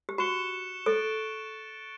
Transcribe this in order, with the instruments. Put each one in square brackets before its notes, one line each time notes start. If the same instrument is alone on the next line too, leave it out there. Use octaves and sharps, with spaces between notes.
[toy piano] G4
[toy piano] F#4 [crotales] C#6 F#6 C#7 E7 G7
[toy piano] A4 [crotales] F#6 A6 D7